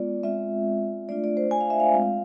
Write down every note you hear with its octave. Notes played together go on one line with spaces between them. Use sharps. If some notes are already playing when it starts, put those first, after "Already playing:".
Already playing: G#3 B3 F4 D5
G#3 C4 F4 E5
A3 D4 F4 D5
D5
C5
G#5
F5
E5
F5
G#3 C4 F4